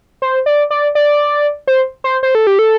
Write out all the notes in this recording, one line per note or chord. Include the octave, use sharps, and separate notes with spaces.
C5
D5
D5
D5
C5
C5
C5
A4
G4
A4